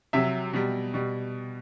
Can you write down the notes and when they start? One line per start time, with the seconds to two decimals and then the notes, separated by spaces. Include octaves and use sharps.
0.13 C3 F#3 E5
0.53 B2 G3
0.94 B2 G3